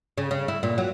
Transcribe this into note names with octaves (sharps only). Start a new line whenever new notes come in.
C#3
C#3
E4
A#2
F#3